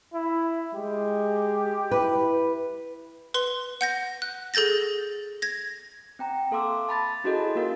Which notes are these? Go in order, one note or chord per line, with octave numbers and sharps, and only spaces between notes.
E4
G#3 G4
E4 B4
B4 C6
F#5 G6 A#6
F#6
G#4 A4 G6 A6 A#6
G#6 A#6
C4 G5 A#5
A#3 A4 F5 C6 D6 E6
A5 B5 A6
C#4 E4 F#4 G#4 A4 D#5
A#3 F4 F#4 A#4 F5